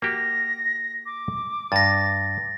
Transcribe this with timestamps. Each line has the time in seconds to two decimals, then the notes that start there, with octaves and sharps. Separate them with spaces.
0.02 A#3 F#4 G4 A#6
1.06 D6
1.72 G2 A6 A#6